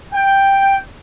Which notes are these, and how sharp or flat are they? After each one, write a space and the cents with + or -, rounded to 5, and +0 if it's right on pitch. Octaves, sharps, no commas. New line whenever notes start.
G5 +5